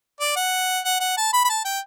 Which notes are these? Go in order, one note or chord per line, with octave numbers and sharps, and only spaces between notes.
D5
F#5
F#5
F#5
A5
B5
B5
A5
G5